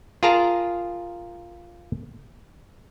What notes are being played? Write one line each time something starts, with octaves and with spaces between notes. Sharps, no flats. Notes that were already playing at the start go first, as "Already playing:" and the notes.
F4 G#4 A#4 A5 A#5